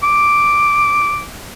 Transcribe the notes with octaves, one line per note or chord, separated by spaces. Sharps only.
D6